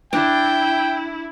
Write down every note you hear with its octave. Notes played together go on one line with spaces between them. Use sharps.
D4 E4 G5